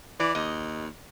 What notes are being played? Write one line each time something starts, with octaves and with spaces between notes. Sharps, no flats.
E3 D5
D#2 D#5